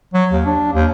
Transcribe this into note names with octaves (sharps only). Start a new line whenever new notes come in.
F#3
D#2
D4
D#2